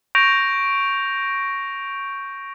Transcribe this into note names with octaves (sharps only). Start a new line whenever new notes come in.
C#6 G6 A#6 D7 F7